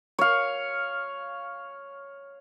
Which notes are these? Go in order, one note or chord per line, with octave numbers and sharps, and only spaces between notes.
C#5 F5